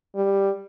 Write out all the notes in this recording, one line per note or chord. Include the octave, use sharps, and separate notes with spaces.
G3